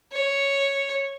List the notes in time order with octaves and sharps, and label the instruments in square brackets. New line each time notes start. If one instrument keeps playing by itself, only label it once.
[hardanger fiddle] C#5